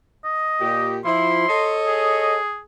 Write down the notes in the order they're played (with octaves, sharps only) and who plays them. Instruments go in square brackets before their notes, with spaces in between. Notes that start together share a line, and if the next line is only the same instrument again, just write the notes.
[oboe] D#5
[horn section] A#2 G4
[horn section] F3 E4 [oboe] C6
[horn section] A4 C#5 D#5
[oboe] G#4